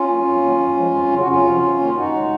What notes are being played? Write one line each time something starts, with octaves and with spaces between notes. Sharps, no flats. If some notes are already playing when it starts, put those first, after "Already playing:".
Already playing: C#4 F4
F#3 A#3
F2
D#3 F#3 A#3
F#2
F3 G#3
F2
C#3 F#3
F#4
F2 C#4 F4
C3 F3
F2
D#3 A#3
F#2 D#4 F#4
C#3 G#3